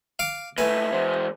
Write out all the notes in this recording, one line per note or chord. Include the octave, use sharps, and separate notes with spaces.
F5 D6
G#2 A3 B4 E5 G#5
E3 G#3 C5